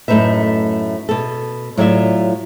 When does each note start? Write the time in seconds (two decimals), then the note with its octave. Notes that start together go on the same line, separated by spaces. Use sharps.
0.08 F#2 A2 A3 D#4 B4 E5
1.09 B2 A4
1.78 A2 F#3 F4 D5 E5